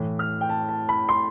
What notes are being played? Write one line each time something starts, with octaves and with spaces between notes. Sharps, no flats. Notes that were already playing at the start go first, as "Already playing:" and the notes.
Already playing: A2 E3
F6
G5
A5
A5
B5
C6